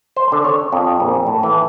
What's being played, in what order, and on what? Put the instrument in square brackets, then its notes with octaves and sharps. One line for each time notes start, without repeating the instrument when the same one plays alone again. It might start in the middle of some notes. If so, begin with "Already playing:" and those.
[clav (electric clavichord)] C5
D3
C#5
F2
A#1
A2
E3